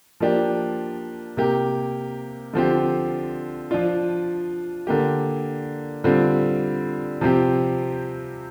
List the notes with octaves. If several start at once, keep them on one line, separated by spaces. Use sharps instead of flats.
F3 A#3 D4 G4
C3 A#3 G4
D3 F3 C4 G4
F3 D4 F4
D3 A#3 G4
D3 G3 C4 F4
C3 F3 C4 G4